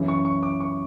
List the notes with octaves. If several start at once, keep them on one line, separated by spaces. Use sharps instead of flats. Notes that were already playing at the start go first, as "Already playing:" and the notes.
Already playing: F#2 C#3 E3
C#6
C#6
D6
C#6